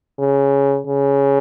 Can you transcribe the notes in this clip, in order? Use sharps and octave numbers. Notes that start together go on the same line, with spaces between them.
C#3
C#3